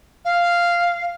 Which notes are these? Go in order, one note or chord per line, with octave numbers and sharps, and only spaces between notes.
F5